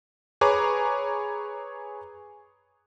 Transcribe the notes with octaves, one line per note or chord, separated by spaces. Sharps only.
G#4 B4 C#5 A#5 D6